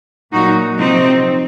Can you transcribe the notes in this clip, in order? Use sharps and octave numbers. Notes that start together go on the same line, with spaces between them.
A#2 F#3 D#4 F#4
C3 F3 C4 D#4